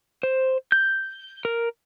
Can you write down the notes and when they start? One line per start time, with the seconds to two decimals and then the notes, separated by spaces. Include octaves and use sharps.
0.23 C5
0.72 G6
1.45 A#4